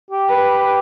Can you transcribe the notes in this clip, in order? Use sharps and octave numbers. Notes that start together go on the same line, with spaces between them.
G4
B4